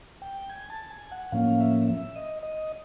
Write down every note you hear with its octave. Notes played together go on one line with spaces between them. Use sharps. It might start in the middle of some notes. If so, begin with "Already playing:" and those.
G5
G#5
A5
G#5
F#5
A2 F3 A#3 C#4 F5
E5
E5
D#5
D#5